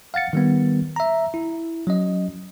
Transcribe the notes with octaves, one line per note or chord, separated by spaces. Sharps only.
F5 F#5 A6 C#7
D#3 G3 B3
E5 A#5
E4
F#3 C#4 D#5